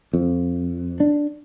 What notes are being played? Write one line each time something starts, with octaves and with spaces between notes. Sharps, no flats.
F2
D4